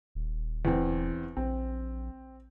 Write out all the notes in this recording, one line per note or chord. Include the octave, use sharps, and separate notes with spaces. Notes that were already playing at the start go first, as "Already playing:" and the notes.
D#1
E2 C4
A#1 C4